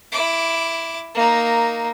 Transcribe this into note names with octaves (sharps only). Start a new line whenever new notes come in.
E4 D6
A#3 D#4